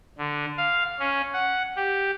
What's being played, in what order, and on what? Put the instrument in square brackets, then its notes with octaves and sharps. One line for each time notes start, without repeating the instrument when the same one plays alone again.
[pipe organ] D3
F5
C#4
F#5
G4